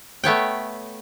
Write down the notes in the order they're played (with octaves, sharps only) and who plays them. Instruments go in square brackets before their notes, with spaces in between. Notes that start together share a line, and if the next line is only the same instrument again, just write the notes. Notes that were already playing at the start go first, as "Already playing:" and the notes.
[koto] A3 B3 C#5 G5